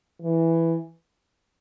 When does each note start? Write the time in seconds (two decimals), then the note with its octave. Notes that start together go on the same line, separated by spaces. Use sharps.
0.22 E3